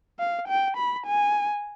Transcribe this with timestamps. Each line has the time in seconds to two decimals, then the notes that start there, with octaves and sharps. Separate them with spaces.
0.20 F5
0.48 G5
0.77 B5
1.06 G#5